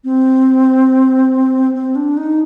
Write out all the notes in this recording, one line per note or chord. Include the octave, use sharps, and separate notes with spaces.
C4
C4
D4
D#4